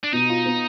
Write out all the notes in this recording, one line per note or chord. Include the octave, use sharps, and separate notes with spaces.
D4
B2 D#4
F4
B3